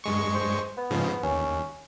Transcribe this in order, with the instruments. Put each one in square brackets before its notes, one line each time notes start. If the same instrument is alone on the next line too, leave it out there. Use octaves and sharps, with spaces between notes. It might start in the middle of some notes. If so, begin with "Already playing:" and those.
[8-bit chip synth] G2 G#3 C#6
[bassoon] C5
B3
[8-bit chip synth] G#2 C#3 F3
[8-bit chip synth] D#2 [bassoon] C#4